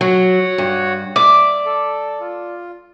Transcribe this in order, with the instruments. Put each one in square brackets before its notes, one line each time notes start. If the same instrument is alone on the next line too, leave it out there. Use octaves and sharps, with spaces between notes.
[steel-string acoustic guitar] F#3 [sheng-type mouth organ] F#4 C#5 F#5
[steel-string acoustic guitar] G2
[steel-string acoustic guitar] D5 [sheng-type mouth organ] E5 [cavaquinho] D6
[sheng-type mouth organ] A4
F4